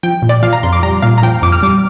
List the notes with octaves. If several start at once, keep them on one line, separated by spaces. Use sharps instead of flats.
F3 G5
A#2
D5
F3 F5
A#5
F2 C6
D6
G3 A#5
A#2 F5
A#5
F3 G5
F2 D6
F6
G3 D6